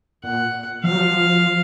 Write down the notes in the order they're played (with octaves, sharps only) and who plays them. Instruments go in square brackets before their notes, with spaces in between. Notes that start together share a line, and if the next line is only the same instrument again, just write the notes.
[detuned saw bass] A#2 [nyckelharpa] F#5
[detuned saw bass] F3 [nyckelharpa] F5
[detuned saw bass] F#3
F3